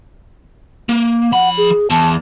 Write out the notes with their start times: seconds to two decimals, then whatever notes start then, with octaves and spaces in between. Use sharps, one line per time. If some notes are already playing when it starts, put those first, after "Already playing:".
0.89 A#3
1.33 F3 F#5 B5
1.58 G#4
1.90 E2 A5